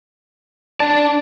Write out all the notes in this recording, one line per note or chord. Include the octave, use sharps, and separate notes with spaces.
D4 D5 A5